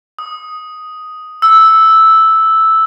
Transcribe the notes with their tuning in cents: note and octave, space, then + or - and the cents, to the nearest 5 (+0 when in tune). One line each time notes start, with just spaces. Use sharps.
D#6 +5
E6 -5